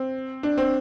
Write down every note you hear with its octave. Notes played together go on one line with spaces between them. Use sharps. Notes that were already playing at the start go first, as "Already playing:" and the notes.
Already playing: C4
D4
C4